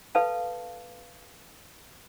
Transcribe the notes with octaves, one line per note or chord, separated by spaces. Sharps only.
A4 B4 F5 A5